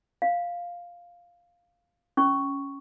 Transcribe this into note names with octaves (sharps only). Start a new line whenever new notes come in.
F5
C#4 C#6